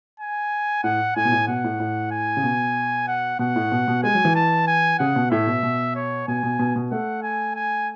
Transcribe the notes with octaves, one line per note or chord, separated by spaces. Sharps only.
G#5
A2 F#5
A2 G#5
B2
A2
B2 F#5
A2
A2
G#5
C#3
B2
F#5
B2 F#5
A2
B2
B2
G#3 G#5
F#3
E3
A5
G#5
C#3 F#5
B2
A2 E5
B2
B2
C#5
B2 G#5
B2
B2
B2
A3 F#5
G#5
G#5